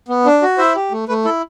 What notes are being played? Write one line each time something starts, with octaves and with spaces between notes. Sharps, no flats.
B3
D4
F#4
E4 C5 E5
G4
A3
A3 B4
E4 A4